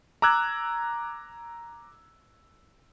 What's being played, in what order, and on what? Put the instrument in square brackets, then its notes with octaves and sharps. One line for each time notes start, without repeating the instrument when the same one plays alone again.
[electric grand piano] A#5 D6 E6 F#6 G#6